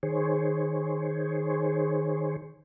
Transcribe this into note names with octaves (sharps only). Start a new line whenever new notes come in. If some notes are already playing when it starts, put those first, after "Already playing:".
D#3 G#4 C5 C#5